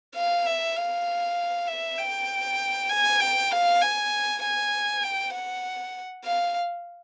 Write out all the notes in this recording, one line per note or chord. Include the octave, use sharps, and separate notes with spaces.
F5
E5
F5
E5
G5
G#5
G5
F5
G#5
G#5
G5
F#5
F5